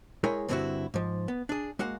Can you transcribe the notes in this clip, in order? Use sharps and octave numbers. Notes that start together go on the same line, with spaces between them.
G#3 E4 G#4 A#4 C#5 G5
G2 D3 C4 D#4 E4 F#4
G#2 F3
B3
D4 G#4
G#3 A#3 F#4 F5 F#5